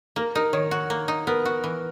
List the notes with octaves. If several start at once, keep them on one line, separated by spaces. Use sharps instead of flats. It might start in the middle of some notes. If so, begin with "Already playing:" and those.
A#3 A#4
D#4 A#4
D#3 C#5
F#4
A#3
D#4
B3 A#4
F#4
E3